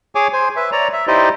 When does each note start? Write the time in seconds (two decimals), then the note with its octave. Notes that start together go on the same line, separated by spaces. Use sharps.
0.15 G#4 C#5 G#5 D6
0.33 C5 G#5
0.56 B4 E5
0.72 C#5 D5 A#5
0.93 E5
1.07 D#4 E4 G4 C5 D5 D#5